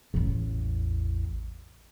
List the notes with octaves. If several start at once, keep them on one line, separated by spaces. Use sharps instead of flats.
A1 E2